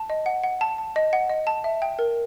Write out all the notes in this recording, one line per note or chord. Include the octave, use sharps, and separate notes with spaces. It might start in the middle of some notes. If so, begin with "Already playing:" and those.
Already playing: A5
D#5
F#5
F#5
A5
A5
D#5
F#5
D#5
A5
E5
G5
A#4